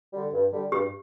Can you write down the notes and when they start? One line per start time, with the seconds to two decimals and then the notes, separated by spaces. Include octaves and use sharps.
0.13 D3 G3
0.33 G2
0.52 D3 G3
0.72 G2 G4